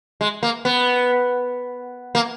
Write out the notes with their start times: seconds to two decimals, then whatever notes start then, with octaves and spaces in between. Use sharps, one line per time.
0.21 G#3
0.43 A#3
0.65 B3
2.15 A#3